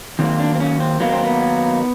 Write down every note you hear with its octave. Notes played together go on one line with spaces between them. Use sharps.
D#3 F#3 A#3 C4
D4
C4
C#4
C4
D#3 F#3 A#3 B3
C4
B3